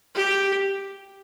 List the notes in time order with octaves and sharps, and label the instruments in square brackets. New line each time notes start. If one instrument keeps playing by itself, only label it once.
[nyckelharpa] G4